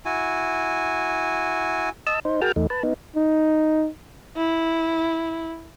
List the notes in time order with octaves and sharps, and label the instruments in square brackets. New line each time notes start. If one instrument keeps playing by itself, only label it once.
[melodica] E4 F#4 G#5
[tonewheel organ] D#5 A5 E6
D#4 C5
F#4 G#4 A#4 G5 A5 F6
E2 A3 D#4
B4 A5
B3 D#4
[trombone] D#4
[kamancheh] E4